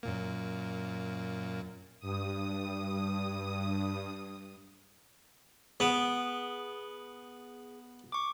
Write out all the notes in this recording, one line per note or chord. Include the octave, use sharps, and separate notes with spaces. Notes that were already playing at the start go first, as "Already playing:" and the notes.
F#2 A#2 A#3
G2 D#6
B3 G#4 D7
C#6 D6